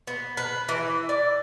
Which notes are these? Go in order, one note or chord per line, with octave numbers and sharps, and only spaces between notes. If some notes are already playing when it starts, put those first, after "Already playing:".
B3
B4
E3
D5